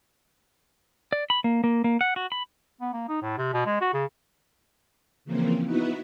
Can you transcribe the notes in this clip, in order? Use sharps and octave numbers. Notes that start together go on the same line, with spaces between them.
D5
B5
A#3
A#3
A#3
F#5
F#4
B5
B3
A#3
D#4
A2
C3
B2
G#3
F#4
C#3
C#3 E3 F3 A#3 C4
B3 D#4 E4 F#4 B4